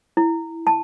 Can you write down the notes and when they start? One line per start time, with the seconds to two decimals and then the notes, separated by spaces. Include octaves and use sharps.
0.17 E4
0.67 A5